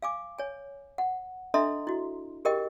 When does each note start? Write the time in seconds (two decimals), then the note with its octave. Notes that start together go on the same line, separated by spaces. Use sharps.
0.02 F5 G#5 D6
0.39 C#5 G#5
0.98 F#5
1.54 D4 A4 D#5 E5 A#5 C6
1.87 E4 F#4
2.45 G4 G#4 A#4 D#5 G5